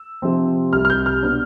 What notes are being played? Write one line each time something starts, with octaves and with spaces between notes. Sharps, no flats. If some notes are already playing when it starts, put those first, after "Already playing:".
Already playing: E6
C3 F3 C4
C2 C3 G3 F6
F6
G6
F6
B2 B3 D4